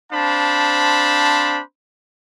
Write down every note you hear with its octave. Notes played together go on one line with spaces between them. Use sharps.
C4 D4 C5 F5 A5 B5